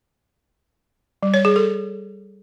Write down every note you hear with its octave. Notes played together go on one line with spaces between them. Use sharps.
G3
C#5
G#4
A4